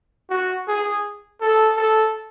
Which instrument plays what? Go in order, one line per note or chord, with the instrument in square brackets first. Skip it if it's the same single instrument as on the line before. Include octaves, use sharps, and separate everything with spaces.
[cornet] F#4
G#4
A4
A4